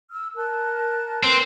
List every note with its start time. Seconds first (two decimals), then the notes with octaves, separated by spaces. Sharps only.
0.11 E6 F6
0.36 A#4 A5 F#6
1.23 C4 A#4 B4